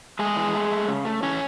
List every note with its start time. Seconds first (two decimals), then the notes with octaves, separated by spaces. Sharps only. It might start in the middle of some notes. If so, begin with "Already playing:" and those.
0.19 G#3 A3 G#4
0.37 E3
0.54 A3
0.71 A3
0.88 C#3
1.05 A3
1.23 E3 C#4 C#5